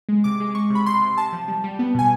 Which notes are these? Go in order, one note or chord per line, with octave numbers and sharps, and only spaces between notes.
G#3
C3 D6
G#3
G#3 C#6
C3
B5
C3 C6
C3
C3 A5
F3
G3
G3
B3
B2 G#5